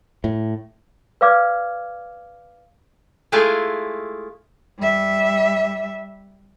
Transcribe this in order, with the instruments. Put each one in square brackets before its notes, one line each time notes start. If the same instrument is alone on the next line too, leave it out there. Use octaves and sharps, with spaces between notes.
[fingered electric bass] A2
[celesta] B4 D5 F5 D6 F6 G#6
[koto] G#3 A3 E4 F4 G#4
[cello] G3 E5